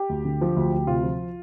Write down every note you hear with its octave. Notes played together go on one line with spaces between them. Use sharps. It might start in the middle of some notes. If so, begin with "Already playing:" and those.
Already playing: G4
D2
D3
F3
D2
D2
C3 F4
F3